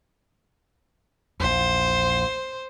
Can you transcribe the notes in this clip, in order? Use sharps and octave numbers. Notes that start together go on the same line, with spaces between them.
A#1 E2 C5